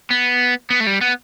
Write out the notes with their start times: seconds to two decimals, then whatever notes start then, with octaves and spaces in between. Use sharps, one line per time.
0.10 B3
0.70 B3
0.80 A3
0.87 G3
1.01 B3